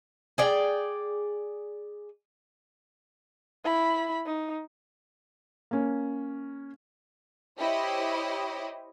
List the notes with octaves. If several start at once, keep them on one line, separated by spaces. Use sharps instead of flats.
G#4 D5 G5
E4 B5
D#4
A#3 C#4
E4 G4 C5 C#5 D#5